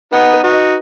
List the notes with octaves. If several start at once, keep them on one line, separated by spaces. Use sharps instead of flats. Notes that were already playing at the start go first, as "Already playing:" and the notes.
B3 D#4 F#5
B4
D#4 F#4
D#5